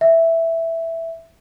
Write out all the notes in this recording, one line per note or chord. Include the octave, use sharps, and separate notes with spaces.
E5